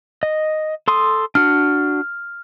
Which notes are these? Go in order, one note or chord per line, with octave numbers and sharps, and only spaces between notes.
D#5
A4 C6 D#6
D4 F#4 F6